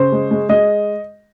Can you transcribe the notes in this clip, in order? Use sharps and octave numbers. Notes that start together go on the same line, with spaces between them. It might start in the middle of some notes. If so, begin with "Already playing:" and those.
Already playing: C#3 C5
G#3
G#3
G#3 D#5